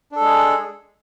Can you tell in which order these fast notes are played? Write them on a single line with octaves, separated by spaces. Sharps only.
D4 A4 G#3 G#4